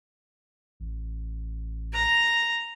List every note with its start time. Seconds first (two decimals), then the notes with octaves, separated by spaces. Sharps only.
0.80 A1
1.94 A#5